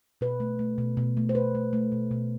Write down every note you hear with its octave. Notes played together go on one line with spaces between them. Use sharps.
B2 B4
A3
A3
B2
B2
A3
C5
B2 B4
A3
A3
B2
B2